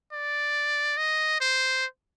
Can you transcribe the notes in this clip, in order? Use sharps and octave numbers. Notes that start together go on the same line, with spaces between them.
D5
D#5
C5